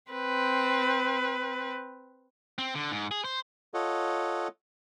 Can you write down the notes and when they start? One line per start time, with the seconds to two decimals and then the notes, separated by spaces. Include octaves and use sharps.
0.12 C4 B4
2.58 C4
2.75 D3
2.92 G#2
3.11 G#4
3.25 C5
3.74 F4 A4 C#5 D#5 F#5